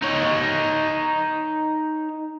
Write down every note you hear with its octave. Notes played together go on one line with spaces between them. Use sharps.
D#4 C#5